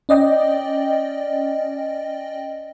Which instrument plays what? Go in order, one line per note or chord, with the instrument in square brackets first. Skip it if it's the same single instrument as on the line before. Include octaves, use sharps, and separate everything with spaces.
[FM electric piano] C#4 D5 D#5 G5